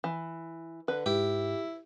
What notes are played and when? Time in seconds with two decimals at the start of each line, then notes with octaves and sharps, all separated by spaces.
0.04 E3
0.88 D3 B4
1.06 G#2 E4 G4